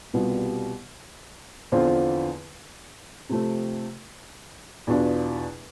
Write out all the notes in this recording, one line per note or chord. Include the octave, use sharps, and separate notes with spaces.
C2 B2 G3 B3 F4
E2 D3 F3 C4 F4
C3 F3 A3 C4
E2 B2 B3 D4 F4